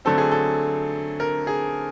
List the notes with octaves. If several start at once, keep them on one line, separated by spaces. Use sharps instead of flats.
D3 F#3 A3 C4 A4
G#4
A4
A#4
G#4